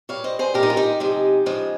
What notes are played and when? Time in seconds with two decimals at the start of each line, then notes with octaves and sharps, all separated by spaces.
0.09 A#2 G3 C#5 F5
0.24 C5 D#5
0.39 G#4 C5
0.54 A#2 G#3 G4 A#4
0.63 D#4
0.70 F4
0.77 D#4 G4
1.00 C3 F3 G#3
1.46 C#3 F3 G#3